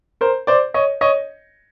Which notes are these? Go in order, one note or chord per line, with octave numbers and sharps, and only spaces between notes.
A#4 C5
C5 D5
C#5 D#5
C#5 D#5